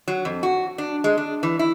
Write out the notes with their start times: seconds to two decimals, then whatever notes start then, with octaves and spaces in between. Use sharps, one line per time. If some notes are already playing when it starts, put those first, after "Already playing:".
0.08 F#3
0.25 F2
0.43 F#4
0.78 D4
1.04 G#3
1.17 D4
1.43 E3
1.59 E4